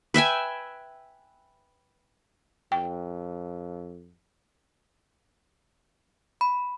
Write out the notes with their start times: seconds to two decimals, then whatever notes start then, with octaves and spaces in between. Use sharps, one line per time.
0.14 B4 E5 G5 G#5
2.72 F2 G5
6.41 B5